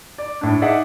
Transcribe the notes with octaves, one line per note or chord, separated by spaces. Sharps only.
D5
A2 D4
D#4 G#4 D5 E5 F#5